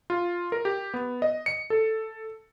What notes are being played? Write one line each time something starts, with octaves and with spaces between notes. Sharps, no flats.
F4
A#4
G4
B3
D#5
C#7
A4